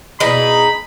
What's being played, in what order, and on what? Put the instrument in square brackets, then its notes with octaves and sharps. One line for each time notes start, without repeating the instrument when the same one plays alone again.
[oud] B2 E3 [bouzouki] D#4 G#4 [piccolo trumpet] B5